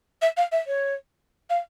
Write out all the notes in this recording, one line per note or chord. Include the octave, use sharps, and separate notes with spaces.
E5
F5
E5
C#5
F5